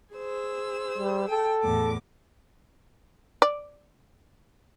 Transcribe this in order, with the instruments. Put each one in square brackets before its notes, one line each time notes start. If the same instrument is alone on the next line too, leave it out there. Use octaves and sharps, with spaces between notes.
[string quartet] G#4 C5 E6
[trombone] G3
[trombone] A4 [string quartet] G5
[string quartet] E2 A2 D6
[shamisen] D5